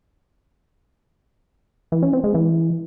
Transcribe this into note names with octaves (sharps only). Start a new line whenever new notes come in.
E3
C#4
C4
G#3
E3